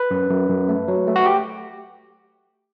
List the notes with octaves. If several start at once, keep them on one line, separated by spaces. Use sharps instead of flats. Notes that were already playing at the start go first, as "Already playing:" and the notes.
Already playing: B4
F#2
F#2
F#2
A3
F#3
A3
F#4
G4